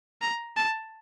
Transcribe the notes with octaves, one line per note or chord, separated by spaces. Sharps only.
A#5
A5